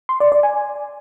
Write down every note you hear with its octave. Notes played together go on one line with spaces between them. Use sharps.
C6
D5
D5
G#5